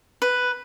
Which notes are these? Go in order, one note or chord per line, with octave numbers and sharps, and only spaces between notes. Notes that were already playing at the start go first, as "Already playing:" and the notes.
B4